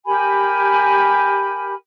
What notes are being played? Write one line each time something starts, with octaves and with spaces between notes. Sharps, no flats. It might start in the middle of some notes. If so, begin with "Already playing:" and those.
G4 A#4 G#5 B5